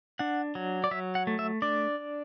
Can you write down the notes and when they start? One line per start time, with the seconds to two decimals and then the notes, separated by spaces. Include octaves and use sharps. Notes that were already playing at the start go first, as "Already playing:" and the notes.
0.19 D4 F#5
0.55 F#3
0.84 D5
0.91 F#3 E5
1.15 F#5
1.27 A3
1.39 E5
1.62 D4 D5